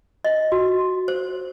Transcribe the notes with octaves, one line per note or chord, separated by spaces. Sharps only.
D#5
F#4
C5